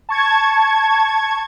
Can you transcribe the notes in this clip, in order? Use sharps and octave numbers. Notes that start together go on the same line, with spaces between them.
A5 C#6 G#6